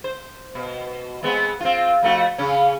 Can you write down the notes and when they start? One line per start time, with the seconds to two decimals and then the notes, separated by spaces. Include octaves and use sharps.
0.04 C5
0.55 B2
1.23 G#3 B3 C4
1.60 C4 F4
2.03 F2 A3 F#4
2.38 C#3 C#4